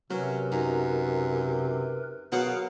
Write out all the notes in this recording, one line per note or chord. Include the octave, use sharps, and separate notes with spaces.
C3 F#3 C#4 A#4 B4
F#2 D#4
B2 F#3 G#4 A#4 F5 F#5